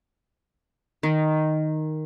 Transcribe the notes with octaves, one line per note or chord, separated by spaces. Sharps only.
D#3